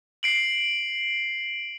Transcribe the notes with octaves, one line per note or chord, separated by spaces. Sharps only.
C7 D7 F#7